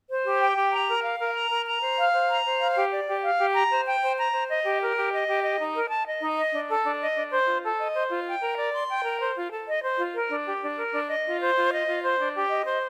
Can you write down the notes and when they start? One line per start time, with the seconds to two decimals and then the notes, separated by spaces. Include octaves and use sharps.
0.10 C5
0.26 G4
0.42 G5
0.56 G4
0.73 A#5
0.87 A#4
1.03 F5
1.19 A#4
1.35 A#5
1.50 A#4
1.66 A#5
1.82 C5
1.98 F5
2.14 C5
2.29 A#5
2.46 C5
2.61 F5
2.76 G4
2.92 D5
3.08 G4
3.23 F5
3.40 G4
3.54 A#5
3.71 C5
3.86 G5
4.02 C5
4.18 A#5
4.33 C5
4.49 D#5
4.65 G4
4.81 A#4
4.96 G4
5.12 D#5
5.28 G4
5.43 D#5
5.59 D#4
5.75 A#4
5.90 A5
6.06 D#5
6.21 D#4
6.37 D#5
6.53 D4
6.69 A4
6.85 D4
7.01 D#5
7.16 D4
7.32 C5
7.47 F4
7.63 A4
7.79 D#5
7.94 C5
8.10 F4
8.27 G5
8.41 A#4
8.57 D5
8.73 C6
8.89 G5
9.05 A#4
9.20 C5
9.37 F4
9.51 A4
9.68 D#5
9.82 C5
9.99 F4
10.14 A#4
10.31 D4
10.46 G4
10.61 D4
10.77 A#4
10.93 D4
11.08 D#5
11.25 F4
11.40 C5
11.56 F4
11.72 D#5
11.87 F4
12.03 C5
12.18 D4
12.34 G4
12.50 D#5
12.65 C5